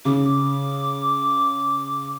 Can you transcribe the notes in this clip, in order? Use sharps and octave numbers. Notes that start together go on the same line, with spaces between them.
C#3 D6